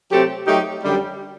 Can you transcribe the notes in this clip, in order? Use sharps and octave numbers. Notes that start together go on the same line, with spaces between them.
C3 F#3 A3 C4 G4
F#3 A3 D#4 G4
F#2 D3 G3